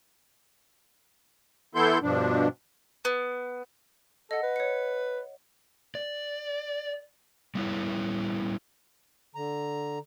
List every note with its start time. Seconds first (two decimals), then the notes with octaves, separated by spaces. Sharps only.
1.75 E3 B3 E4 A4 C6 G6
2.02 G2 B2 F3 D4
3.05 B3
4.31 A4 D#5 F#5
4.43 B4
4.56 C#5 C#7
5.95 D5
7.55 G3 B3 D#4 E4 C#5
9.35 D3 A#5